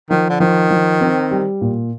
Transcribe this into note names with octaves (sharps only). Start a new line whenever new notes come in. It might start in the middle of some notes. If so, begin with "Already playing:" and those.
D#3 F3
D3
D#3 F3
F3
C4
G3
A#2